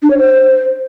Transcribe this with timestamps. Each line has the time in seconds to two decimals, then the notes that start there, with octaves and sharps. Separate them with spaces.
0.03 D4
0.10 C#5
0.18 C5